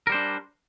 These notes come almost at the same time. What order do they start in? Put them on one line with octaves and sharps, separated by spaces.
A#4 G3 C5 D4